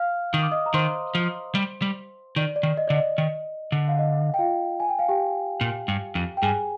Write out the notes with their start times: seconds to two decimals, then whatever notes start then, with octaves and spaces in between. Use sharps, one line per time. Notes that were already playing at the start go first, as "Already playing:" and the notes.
Already playing: F5 F6
0.33 D#3 D#6
0.43 D6
0.52 D#5 D#6
0.66 A#5
0.74 D#3 C5 C6
1.15 F3
1.55 G3
1.82 G3
2.36 D#3 D5
2.56 D5
2.63 D#3
2.77 D#5
2.88 D3 D5
2.97 D#5
3.18 D#3
3.72 D3
3.88 F5
3.99 D#5
4.34 G5
4.39 F4 F5
4.80 G#5
4.89 G5
4.99 F5
5.09 G4 G5
5.61 A#2
5.88 G2
6.15 F2
6.37 G5
6.42 G2 G#4 G#5